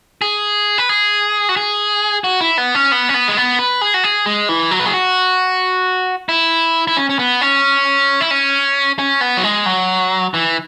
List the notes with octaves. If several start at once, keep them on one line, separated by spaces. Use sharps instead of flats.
G#4
B4
G#4
F#4
G#4
F#4
E4
B3
C#4
B3
C#4
B3
G#3
B3
B4
G#4
F#4
G#4
G#3
E3
F#3
B4
G#4
F#4
E4
E4
C#4
C#4
B3
C#4
E4
C#4
C#4
B3
F#3
G#3
F#3
E3